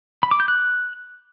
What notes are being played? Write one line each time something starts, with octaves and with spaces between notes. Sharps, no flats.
B5
D6
G6
F#6